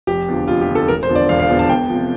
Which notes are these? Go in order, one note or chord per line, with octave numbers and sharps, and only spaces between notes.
F1 G4
E2 D3 F3
F1 F4
G4
E2 D3 F3
A4
E1 A#4
C5
E2 D3 F3
D5
E1 F5
F5
E2 D3 F3
A5
E2 G5
C3 F3